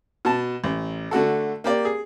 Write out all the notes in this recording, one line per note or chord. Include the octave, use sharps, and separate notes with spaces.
B2 A5
A1
D3 A3 F#4 A4
A#3 G4 D5
G#4